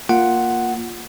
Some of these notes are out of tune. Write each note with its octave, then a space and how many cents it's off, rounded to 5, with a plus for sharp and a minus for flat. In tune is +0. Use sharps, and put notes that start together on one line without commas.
A#3 +0 F4 +0 F#5 +5